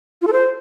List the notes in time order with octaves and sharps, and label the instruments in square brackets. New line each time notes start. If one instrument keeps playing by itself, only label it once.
[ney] F4
A4
C5